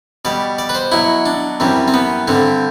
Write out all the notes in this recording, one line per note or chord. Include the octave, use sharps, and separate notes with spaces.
B2 G3 D5
D5
B4
C5
B2 F#3 E4
D4
F#2 E3 G3 C4
C4
B3
G2 D3 G3 C4